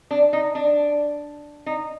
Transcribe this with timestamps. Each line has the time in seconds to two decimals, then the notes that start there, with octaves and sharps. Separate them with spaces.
0.11 D4
0.33 D#4
0.55 D4
1.66 D#4